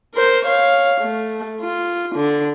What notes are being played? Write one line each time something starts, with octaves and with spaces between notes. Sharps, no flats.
A#4 C5
C#5 F5
A3
F4
D3